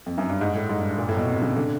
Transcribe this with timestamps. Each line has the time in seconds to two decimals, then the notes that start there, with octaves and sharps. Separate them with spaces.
0.06 F2
0.18 F#2
0.29 G2
0.41 G#2
0.55 A2
0.69 G#2
0.79 G2
0.98 A#2
1.09 A2
1.17 B2
1.27 C3
1.42 C#3
1.57 D3